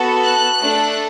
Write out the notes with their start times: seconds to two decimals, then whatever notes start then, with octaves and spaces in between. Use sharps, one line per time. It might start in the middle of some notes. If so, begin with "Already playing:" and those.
Already playing: B3 F#4 A4
0.23 F#6
0.62 A3 D4 A4